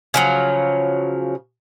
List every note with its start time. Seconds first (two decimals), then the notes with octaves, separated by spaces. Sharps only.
0.14 C#3 F3 F#3